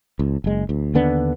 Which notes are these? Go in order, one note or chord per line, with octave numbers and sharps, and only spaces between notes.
C#2
F#1 G#3
D2
D#2 D3 B3 D4